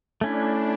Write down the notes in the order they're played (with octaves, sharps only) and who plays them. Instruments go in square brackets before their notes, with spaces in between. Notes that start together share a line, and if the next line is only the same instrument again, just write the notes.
[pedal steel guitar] A3 C#4 E4 [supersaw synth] D4